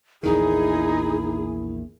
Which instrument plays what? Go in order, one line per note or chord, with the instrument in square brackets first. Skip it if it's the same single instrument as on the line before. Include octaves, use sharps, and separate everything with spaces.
[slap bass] A#1 E2 D#3 [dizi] D#4 [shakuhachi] E4 [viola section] G#4